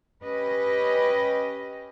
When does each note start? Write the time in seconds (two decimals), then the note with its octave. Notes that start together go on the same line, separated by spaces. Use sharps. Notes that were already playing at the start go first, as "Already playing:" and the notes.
0.23 C#4 G4 B4 D#5